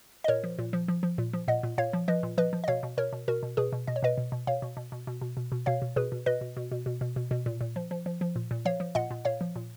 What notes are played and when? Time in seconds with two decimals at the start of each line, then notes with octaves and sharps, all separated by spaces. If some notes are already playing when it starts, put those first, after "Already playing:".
0.24 D#5
0.28 A#2 A#4 C#5
0.44 F3
0.59 A#2
0.73 F3
0.88 F3
1.03 F3
1.18 A#2
1.33 F3
1.48 A#2 D#5 F#5
1.63 A#2
1.78 A#2 C#5 F5
1.93 F3
2.08 F3 B4 D#5
2.23 A#2
2.38 F3 B4 D#5
2.53 F3
2.64 D#5
2.68 B2 C#5 F5
2.83 B2
2.97 B2 A#4 C#5
3.13 B2
3.28 B2 F#4 A#4
3.43 B2
3.57 B2 G#4 B4
3.72 B2
3.87 B2 D#5
3.96 C#5
4.03 B2 B4 D#5
4.18 B2
4.32 B2
4.47 B2 C#5 F5
4.62 B2
4.77 B2
4.92 B2
5.07 B2
5.21 B2
5.37 B2
5.52 B2
5.66 B2 C#5 F5
5.82 B2
5.96 B2 G#4 B4
6.12 B2
6.26 B2 B4 D#5
6.41 B2
6.57 B2
6.71 B2
6.86 B2
7.01 B2
7.16 B2
7.31 B2
7.46 A#2
7.61 A#2
7.76 F3
7.91 F3
8.06 F3
8.21 F3
8.36 A#2
8.51 A#2
8.65 F3 C#5 F5
8.80 F3
8.95 A#2 D#5 F#5
9.11 A#2
9.25 A#2 C#5 F5
9.41 F3
9.56 A#2